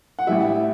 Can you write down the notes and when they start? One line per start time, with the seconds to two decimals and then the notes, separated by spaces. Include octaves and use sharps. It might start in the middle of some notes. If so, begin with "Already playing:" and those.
0.19 F#5
0.27 A1 A2 E3 G3 E5